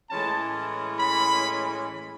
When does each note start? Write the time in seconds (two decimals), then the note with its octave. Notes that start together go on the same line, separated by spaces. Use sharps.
0.10 A2 E3 G#3 C#4 A5
1.00 B5